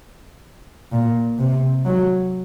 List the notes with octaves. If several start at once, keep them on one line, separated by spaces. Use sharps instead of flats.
A#2
C3
F#3